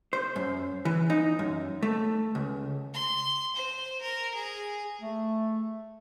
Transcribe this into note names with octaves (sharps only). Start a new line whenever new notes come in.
C5
F#2
E3
D#4
F#2
A3
C#2
C6
C5
A#4
G#4
A3